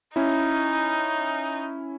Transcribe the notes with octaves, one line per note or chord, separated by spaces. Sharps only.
C#4 D#4 E4